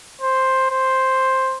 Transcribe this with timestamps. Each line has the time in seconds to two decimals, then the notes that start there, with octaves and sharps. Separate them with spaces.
0.21 C5
0.71 C5